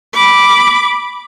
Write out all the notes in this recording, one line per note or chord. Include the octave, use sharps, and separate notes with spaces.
B5 D6